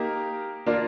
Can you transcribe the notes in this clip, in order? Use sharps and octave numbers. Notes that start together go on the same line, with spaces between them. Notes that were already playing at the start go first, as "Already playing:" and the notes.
Already playing: A#3 D#4 G4 A#4
A#3 D4 F4 A#4 D5